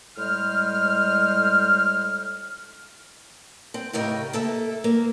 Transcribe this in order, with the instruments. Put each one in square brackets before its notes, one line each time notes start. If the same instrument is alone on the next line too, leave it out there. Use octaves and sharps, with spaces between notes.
[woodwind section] A2 G3 G#3 C5 F6
[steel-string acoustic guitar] C4
A2 C#3 G4 A#4 D#5
A#3 A4 E5
A#3